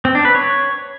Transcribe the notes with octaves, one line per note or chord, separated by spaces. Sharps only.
C4
D4
B4
C#5